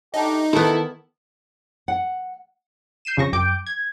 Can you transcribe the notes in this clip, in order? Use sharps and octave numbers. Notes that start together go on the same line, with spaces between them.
A3 D4 D#4 G4
D#3 B3 E4 A4
F#5
G6 C7 D#7 E7
F2 C#3 C#6 A#6
F#2 G5 D6 G6 D7
G#6